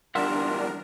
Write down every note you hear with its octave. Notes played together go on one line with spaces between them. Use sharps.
E2 G3 D4 F4 A#4 E5 F#5